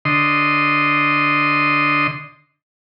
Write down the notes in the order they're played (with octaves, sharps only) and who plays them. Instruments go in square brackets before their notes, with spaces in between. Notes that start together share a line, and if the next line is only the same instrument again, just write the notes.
[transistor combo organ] D3 D#5 C6